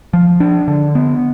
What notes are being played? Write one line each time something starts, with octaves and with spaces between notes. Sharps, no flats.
F3
D4
D3
B3